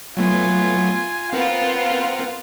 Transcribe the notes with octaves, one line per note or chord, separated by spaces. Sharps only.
F#3 A3 B3 F4 G#5
B3 C4 F4 A#4 F5 F#5